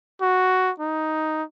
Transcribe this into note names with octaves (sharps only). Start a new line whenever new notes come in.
F#4
D#4